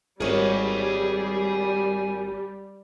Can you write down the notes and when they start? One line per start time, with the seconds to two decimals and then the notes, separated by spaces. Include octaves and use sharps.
0.20 G#1 G3 G#4 A#4 C#5 F#5